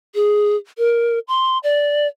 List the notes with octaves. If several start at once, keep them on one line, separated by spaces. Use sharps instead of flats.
G#4
A#4
C6
D5